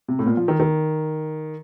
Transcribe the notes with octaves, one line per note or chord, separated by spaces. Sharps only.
C3
A2
A#2
F3
D#3
D#3